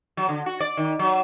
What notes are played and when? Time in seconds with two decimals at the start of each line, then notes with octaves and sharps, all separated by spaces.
0.17 F#3
0.29 D3
0.46 F#4
0.60 D5
0.77 D#3
0.99 F#3